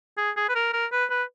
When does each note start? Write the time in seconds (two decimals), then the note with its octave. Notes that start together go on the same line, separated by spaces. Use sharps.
0.17 G#4
0.36 G#4
0.49 B4
0.55 A#4
0.73 A#4
0.92 B4
1.10 B4